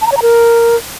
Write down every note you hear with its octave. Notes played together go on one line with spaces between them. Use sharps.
A5
A#5
C#5
A#5
A#4